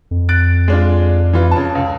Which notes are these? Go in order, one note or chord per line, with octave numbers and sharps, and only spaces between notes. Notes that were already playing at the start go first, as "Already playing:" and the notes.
F2
F#6 A6 D7
G#3 D4 F4
E3 F4
C#3 A5
C#2